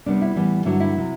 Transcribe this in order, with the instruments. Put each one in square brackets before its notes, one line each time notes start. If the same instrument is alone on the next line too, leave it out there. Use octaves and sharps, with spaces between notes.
[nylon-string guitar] C3 G3 B3 D4
E4
A2 E3 G3 B3
G2 D3 F#3 E4
E4
C3 F#3